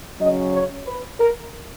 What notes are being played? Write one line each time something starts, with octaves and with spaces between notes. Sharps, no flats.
C#3 F#3 C#4 D#5
C#5
B4
A#4